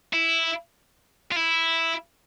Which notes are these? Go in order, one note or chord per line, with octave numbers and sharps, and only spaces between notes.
E4
F4
E4